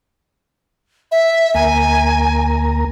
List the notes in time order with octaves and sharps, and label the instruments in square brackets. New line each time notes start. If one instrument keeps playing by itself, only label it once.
[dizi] E5
[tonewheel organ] D2 A#3 A#5 [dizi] G#5